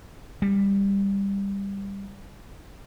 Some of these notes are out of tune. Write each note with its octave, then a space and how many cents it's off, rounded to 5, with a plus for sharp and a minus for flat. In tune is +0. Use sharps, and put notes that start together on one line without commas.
G3 +15